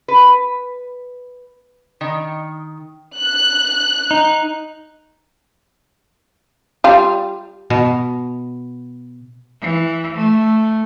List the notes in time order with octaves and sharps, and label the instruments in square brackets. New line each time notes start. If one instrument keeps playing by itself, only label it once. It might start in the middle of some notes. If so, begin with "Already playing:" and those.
[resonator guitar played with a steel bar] B4
D#3
[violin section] F#6
[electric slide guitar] D#4
[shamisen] G3 F4
[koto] B2
[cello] E3
A3